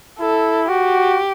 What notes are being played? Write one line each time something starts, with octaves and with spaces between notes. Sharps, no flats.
E4 A4
F#4 G4